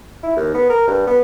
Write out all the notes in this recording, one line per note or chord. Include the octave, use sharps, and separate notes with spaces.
E4
D#2
B3
A#4
G2
B3